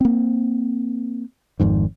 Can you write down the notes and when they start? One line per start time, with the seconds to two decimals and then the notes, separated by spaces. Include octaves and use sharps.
0.01 A#3 C4
1.60 G#1 F2 G#2 D#3